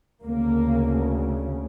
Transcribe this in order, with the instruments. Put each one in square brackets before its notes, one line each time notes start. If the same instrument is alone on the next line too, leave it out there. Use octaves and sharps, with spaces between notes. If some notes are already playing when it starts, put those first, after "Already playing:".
[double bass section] D2 C#3 A#3